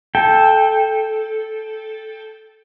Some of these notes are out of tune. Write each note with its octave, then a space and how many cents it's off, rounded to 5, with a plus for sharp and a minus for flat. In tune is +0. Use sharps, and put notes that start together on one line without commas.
A4 -10 G5 +10